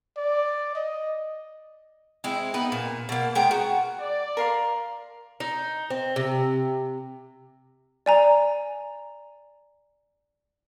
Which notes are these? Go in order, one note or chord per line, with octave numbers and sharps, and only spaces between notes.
D5
D#5
G#3 C4 E4
B3 D#4 B4
A#2
B2 A#3
G#3 B3 A#4 G5
F#4
D5
A#4 F5 C6
D#4
C4
C3
D5 G#5 A#5